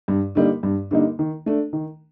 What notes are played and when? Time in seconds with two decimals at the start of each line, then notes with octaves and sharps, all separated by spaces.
0.08 G2
0.35 D3 G3 A#3 D#4
0.63 G2
0.91 D3 G3 A#3 D#4
1.19 D#3
1.46 A3 D4
1.73 D#3